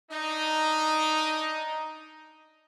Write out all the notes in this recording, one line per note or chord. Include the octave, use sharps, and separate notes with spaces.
D4 D#4